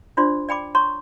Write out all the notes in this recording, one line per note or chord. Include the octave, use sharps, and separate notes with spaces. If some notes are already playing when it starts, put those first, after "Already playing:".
D4 F4 C5 D5 C6
D5 G5 B5 D6
C#5 A#5 C6 C#6